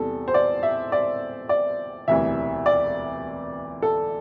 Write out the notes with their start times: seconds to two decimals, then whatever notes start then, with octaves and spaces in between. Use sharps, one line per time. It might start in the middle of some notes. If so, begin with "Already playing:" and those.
Already playing: E2 C3 G3 A4
0.28 C5
0.34 D5
0.63 E5
0.92 D5
1.49 D5
2.08 E1 D2 C3 E3 G3 E5
2.66 D5
3.82 A4